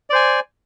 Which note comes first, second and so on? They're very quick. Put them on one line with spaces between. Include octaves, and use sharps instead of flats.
D5 C5 G#5